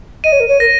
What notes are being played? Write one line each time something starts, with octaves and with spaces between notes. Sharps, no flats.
D#5 D#7
C#5
A#4
C#5
A#4 A#6